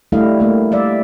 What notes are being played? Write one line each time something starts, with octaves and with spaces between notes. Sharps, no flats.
G3 A3 D4 E4 D#5 F5
A3 A#3
G3 D5 E5